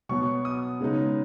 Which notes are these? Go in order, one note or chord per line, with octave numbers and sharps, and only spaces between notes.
B2 F#3 B3 C#6
D#6
C#3 G#3 B3 D#4